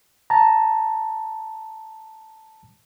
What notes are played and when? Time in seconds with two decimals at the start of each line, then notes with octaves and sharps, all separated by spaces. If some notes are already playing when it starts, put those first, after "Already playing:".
0.30 A5 A#5